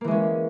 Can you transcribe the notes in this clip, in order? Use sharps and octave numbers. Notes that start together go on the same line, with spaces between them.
E3 G#3 A#3 C#4